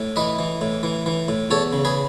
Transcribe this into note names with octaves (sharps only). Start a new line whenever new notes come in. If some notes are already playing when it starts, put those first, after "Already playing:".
Already playing: A2
E3 B4 D#5
E3
A2
E3
E3
A2
E2 A4 C#5
C#3
G#4 B4